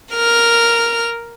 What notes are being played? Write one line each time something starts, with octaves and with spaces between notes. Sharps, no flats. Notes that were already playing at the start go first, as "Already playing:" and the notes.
A#4 F6